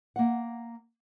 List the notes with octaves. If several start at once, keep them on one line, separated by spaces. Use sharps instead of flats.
A#3 F#5